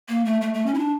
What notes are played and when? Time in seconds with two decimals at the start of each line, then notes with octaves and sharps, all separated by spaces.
0.09 A#3
0.25 A3
0.41 A3
0.54 A3
0.66 C#4
0.74 E4
0.79 D4